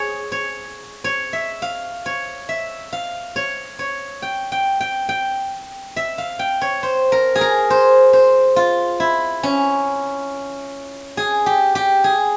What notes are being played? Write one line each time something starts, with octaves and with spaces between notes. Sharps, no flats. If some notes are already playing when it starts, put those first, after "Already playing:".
Already playing: G#4 C#5
C#5
C#5
E5
F5
C#5
E5
F5
C#5
C#5
G5
G5
G5
G5
E5
F5
G5
C#5
C5
A#4
G#4
A#4
C5
C5
F4
E4
C#4
G#4
G4
G4
G#4